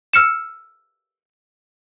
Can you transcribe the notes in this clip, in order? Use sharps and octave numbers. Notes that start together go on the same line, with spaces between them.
E6 F6 C#7 E7